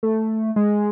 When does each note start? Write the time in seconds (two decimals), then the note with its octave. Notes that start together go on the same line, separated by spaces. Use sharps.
0.03 A3
0.56 G#3